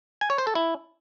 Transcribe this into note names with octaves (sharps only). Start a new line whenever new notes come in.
G#5
C#5
C5
A4
E4